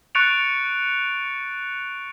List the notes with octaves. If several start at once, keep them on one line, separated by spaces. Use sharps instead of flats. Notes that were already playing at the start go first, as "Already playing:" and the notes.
C#6 F#6 A6 C#7 D7 F7